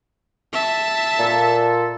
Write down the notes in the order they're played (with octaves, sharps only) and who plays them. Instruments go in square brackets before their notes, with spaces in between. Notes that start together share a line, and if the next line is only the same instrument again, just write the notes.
[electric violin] E5 A5
[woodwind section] A#2 A4